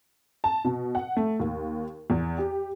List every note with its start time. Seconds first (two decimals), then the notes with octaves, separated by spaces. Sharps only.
0.44 A5
0.64 B2
0.95 F#5
1.17 A3
1.40 D#2
2.10 E2
2.38 G4